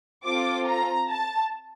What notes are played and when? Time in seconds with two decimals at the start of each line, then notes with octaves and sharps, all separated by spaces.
0.25 C4 F4 A4 D6
0.67 A#5
1.10 A5